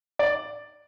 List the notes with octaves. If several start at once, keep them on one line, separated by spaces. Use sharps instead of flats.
D5